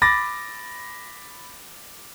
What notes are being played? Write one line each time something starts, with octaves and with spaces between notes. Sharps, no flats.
B5 D6 A6 A#6